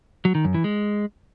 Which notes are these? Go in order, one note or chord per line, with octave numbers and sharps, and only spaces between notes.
F#3
D#3
F#2
E3
G#3